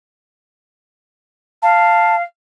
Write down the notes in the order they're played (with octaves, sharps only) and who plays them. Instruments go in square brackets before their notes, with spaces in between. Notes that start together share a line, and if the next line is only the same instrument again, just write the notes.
[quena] F5 [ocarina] A5